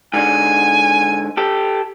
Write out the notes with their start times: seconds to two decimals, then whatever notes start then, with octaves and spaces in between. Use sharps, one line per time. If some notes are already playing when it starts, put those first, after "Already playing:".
0.14 G#2 D3 G#3 G#5
1.37 G4 A4